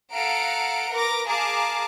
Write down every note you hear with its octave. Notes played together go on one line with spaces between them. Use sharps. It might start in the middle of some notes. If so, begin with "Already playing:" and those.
A4 F5 F#5 A#5 D7
A#4 B4 D6 A#6
G#4 A#4 F5 A5 A#5 D6